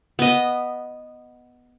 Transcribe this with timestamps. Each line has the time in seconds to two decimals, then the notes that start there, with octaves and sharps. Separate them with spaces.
0.19 B3 D#5